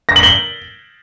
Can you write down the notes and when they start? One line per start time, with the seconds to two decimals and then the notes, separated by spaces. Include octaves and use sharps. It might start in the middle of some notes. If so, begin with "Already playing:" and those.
0.09 A#6
0.16 F#7
0.23 G7